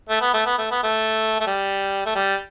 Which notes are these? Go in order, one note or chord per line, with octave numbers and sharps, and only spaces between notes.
A3
B3
A3
B3
A3
B3
A3
A3
G3
A3
G3